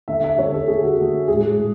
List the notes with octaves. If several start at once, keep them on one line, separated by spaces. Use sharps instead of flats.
D3 A3 E5
E5
D3 A3 C#5
A4
D3 A3 G#4
F#4
D3 A3
A2 G#3 G#4
A2